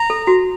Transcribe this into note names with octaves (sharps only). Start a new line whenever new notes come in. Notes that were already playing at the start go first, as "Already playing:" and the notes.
Already playing: A#5
A4
F#4